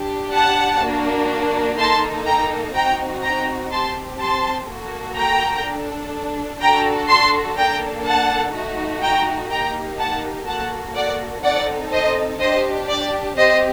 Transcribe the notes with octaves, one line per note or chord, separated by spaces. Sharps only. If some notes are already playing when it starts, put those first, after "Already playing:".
Already playing: D4 G4
F#5 A5
A#3 D4 F#4
A#3 D#4 A4 A5 C6
G5 A#5
C4 D#4 F#4 G5 A#5
G5 A#5
C4 G4 A5 C6
A5 C6
A#3 F#4 A4
G5 A#5
D4 A4
D4 F#4 A4 G5 A#5
A5 C6
A#3 D4 A4 G5 A#5
F#5 A5
A3 D#4 F#4
G5 A#5
A#3 D#4 G4 G5 A#5
F#5 A5
A#3 F#4 A4 F#5 A5
D5 F#5
C4 D#4 A4 D5 F#5
C5 D#5
D4 G4 C5 D#5
D5
C4 G4 C5 D#5